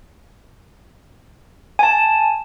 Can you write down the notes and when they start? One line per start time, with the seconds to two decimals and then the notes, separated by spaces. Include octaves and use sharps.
1.79 G#5 A5